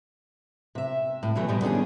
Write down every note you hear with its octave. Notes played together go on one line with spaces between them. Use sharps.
C3 E5
A2
B2 D3 E3 F#3 A3
B2 F3 G3
D3 D#3 C#4 G#4